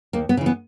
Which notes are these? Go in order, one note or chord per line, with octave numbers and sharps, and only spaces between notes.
D#2 A#3
B3
C#3 E3
B3